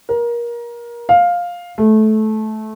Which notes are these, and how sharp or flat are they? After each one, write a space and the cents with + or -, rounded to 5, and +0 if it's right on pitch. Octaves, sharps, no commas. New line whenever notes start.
A#4 +25
F5 +10
A3 -20